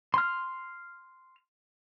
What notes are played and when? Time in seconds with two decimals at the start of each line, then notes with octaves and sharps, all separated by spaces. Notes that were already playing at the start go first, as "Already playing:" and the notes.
0.14 C6 F6